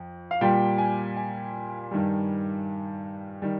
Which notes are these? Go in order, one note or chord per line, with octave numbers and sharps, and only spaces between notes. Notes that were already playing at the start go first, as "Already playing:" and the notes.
Already playing: F2
F5
A#2 G3 G5
G#5
G#5
G2 D#3 G3
D#3 G3